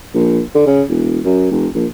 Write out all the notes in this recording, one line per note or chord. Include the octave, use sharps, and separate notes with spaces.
A#1
D3
C#3
E1
F#2
F1
A#1